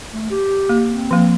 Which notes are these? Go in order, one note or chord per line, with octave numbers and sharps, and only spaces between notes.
A3
G4
A#3
C4
F3 A#3